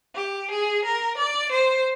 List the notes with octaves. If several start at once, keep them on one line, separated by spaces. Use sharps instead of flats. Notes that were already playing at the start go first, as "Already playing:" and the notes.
G4
G#4
A#4
D5
C5